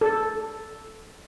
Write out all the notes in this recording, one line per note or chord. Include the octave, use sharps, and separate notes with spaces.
A4